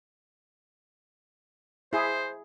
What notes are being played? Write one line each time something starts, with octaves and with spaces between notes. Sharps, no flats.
E4 G#4 C5